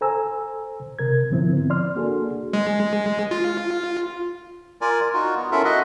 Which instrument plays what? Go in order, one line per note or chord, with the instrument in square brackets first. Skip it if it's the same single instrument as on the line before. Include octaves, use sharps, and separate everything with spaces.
[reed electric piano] A4 C5 G#5 A#5 E6
C3 A#4 G#6
G#2 D3 F3 B3 C4 E4
D5 C6 F6
A#3 D4 F#4 G#4 A4
[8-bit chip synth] G#3
F4
[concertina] F4 A#4 D5 G#5
A#4
D#4 F4 F#4
B3
C#4 E4 F4 A4 A#4 E5
F#4 D#5 E5 F#5